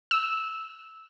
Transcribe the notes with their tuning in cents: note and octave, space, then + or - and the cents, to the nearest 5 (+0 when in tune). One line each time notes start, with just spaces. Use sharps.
E6 -15